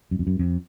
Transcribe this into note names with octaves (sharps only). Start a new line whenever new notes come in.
F#2
F2
F#2
F2